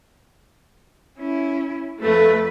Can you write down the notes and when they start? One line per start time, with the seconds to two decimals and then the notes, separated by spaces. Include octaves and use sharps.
1.19 C#4 E4
2.03 F2 A3 B4